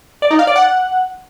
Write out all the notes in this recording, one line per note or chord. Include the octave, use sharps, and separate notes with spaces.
D5
D#4
F5
D5
F#5